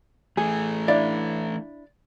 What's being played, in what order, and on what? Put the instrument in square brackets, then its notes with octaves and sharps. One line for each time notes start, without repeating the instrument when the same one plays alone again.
[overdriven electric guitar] E3 A3 [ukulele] G#4
[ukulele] D4 E4 [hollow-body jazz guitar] D5 F5